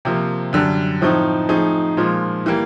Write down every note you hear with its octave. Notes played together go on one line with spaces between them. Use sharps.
C3 F3 A#3
F#2 D3 G3
A2 F3 A3 C4 D#4
F3 A3 C4 D#4 G#4
A#2 F3 G#3
E3 G3 A#3